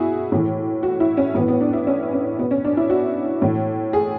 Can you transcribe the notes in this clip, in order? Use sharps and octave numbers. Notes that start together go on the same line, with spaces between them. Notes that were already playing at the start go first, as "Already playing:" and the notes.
Already playing: B2 E4 F#4 G#4
A2 E3
F#4
E4
C#4
A2 E3 B3
B3
D4
E4
C#4
C#4
B2 B3
C#4
D4
E4
F#4
A2 E3
G#4